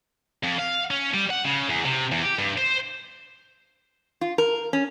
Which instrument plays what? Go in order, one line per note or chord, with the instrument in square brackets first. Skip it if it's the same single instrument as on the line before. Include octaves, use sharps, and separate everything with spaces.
[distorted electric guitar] F2
F5
C#4
G3
F#5
C#3
E2
C3
E2
G4
G2
C5
[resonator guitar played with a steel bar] F4
A#4
C#4